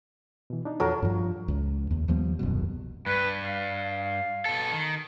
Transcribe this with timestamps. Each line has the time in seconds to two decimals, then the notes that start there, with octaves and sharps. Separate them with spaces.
0.50 B2 E3
0.65 D4 D#4
0.80 E2 A#2 F3 F#3 A4 A#4
1.02 G2 F3
1.48 C#2
1.91 D#2
2.08 D#2 F3 G3 B3
2.39 D#1 C2 F#2 B2
3.06 G2 B4
3.44 F5
4.45 B2 A4
4.71 D#3